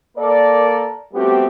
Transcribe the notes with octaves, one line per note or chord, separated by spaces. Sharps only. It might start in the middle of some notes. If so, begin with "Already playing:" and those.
A#3 A4 A#4 D5
G3 A3 B3 C4 F#4 G4